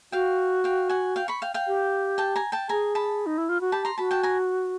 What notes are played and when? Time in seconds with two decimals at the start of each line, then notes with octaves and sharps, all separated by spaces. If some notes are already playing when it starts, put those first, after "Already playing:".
0.12 F#4 F5 G5
0.64 F5 G5
0.89 F#5 G#5
1.16 F5 G5
1.28 B5 C#6
1.42 F5 G5
1.54 F5 G5
1.67 G4
2.18 G5 A5
2.36 G#5 A#5
2.52 G5 A5
2.69 G#4 G#5 A#5
2.95 A5 B5
3.26 D#4
3.38 E4
3.49 F4
3.61 F#4
3.72 G4 A5 B5
3.85 A#5 C6
3.98 F#4 A5 B5
4.11 G5 A5
4.23 G#5 A#5